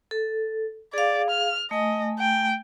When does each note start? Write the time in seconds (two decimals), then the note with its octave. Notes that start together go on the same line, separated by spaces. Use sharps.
0.11 A4
0.94 G#4 D5 F5
1.30 F6
1.71 A3 D#5 G#5
2.19 G5